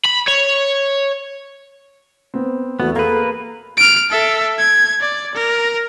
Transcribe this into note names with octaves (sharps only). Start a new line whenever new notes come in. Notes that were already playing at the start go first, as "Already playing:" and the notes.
B5
C#5
B3 C4
E2 A3 B3 F#4
A#3 G#4 A4 B4 F5
F6 D7
A4 E5
G#6
D5
A#4